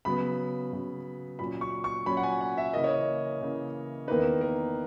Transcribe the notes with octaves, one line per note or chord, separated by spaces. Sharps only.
C#3 F#3 B3 B5
C#3 F#3 B3
A#2 F#3 C#4 B5
C#6
C#6
A#2 F#3 C#4 B5
F#5
G#5
F#5
E5
C#3 E3 A#3 D#5
C#5
D#5
C#3 E3 A#3
E2 D#3 A#3 D#4 B4
A#4